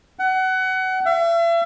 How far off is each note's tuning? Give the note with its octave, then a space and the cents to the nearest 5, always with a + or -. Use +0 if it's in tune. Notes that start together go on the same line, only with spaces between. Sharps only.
F#5 +25
E5 +40